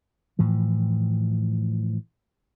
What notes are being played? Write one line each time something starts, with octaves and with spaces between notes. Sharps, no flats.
A2 E3 F3